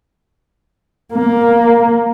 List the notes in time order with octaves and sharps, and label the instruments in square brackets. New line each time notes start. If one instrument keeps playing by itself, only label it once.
[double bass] A#3